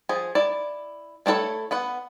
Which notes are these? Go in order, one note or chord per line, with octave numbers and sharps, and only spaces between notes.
F3 G#4
E4 D5
A3 D4 E4 A4 C#5
B3 B4 F#5